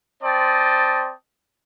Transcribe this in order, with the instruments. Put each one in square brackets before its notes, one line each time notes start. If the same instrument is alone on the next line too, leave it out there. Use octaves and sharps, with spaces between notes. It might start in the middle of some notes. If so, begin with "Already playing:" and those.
[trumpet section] C4 C5 D5 D#5 G5 A5